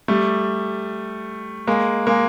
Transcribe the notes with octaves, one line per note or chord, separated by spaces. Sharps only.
G3 A3
G#3 A#3
G#3 A#3